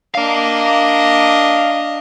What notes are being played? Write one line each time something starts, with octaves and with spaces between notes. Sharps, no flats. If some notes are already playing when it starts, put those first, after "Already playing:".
D4 A#4 D#5 F5